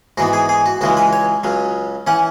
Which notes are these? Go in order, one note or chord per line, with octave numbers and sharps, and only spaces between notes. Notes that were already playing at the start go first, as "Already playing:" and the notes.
G#2 E3 B3 F#4
G#4
G#4
F#4
C#2 C#3 E3 G#3 F#4
B4
C#5
C#2 C#3 F#3
E3 C#4 F#5